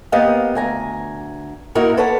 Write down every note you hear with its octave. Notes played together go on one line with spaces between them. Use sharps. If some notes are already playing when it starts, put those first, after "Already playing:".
A#3 B3 G4 D#5 F5
D2 G#5 A#5
A#3 D#4 E4 F#4 A#4
A4 B4 C#5 D5 F#5 A5